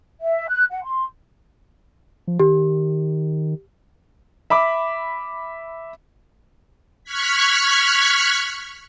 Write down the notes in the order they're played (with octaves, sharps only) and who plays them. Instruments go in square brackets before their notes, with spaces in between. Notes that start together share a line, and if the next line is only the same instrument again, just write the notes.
[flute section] E5
F#6
F#5
C6
[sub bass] F3
[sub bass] D#3 [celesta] G4
[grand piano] E5 B5 D6
[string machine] C#6 F6 F#6 G#6 B6